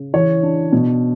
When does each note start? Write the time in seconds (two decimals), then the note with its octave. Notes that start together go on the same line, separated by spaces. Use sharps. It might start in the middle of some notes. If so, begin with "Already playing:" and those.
Already playing: C#3
0.13 E3 C#5
0.43 D4
0.72 B2